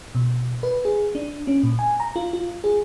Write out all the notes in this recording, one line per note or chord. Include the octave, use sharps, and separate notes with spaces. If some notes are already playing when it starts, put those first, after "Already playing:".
B2
B4
G#4
D4
C#4
A#2
G#5
A#5
F4
F4
G#4